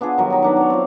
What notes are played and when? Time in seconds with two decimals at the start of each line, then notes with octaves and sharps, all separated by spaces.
0.01 B3 D4 F4 G#4
0.18 D#3 F#3 G3
0.30 D#4 G5
0.42 F#3 D4 B4
0.57 C#5 D5
0.70 C4 F4